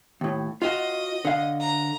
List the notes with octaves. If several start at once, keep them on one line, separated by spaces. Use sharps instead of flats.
D#2 A2
F4 F#4 D#5
D3 F5
A#5